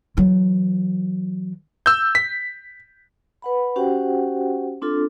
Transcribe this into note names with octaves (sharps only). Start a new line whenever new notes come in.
E3 F#3
E6 G6
B6
B4 F#5 B5
C#4 F#4 G4 C5 F#5 G5
C4 D4 F4 A4